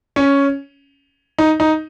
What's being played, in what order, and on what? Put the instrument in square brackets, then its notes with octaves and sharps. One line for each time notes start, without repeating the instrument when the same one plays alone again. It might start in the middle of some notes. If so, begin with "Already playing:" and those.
[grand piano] C#4
D#4
D#4